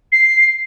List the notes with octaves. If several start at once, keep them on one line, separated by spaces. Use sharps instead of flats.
C7